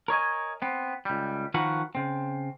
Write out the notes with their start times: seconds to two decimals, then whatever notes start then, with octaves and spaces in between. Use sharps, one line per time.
0.08 A#4 C#5 D#5 G#5
0.62 B3 C4
1.05 C#2 G3
1.54 D#3 F3 F#4 A#4 B4 F#5
1.95 C#3 C4